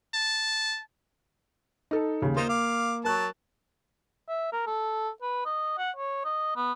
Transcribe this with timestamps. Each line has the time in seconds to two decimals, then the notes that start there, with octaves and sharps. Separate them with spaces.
0.14 A5
1.91 D#4 A4
2.22 D#2 C#3
2.37 A#3 D#4 F4 C5
2.49 F5 D6
3.05 F#3 A#4 A5 F#6
4.28 E5
4.52 A#4
4.67 A4
5.22 B4
5.45 D#5
5.78 F#5
5.96 C#5
6.25 D#5
6.56 B3